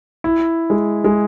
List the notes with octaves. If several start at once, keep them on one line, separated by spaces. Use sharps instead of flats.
E4
G#3
G#3